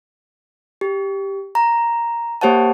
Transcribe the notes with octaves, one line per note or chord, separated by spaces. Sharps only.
G4
A#5
A#3 G4 C5 C#5 F#5 A5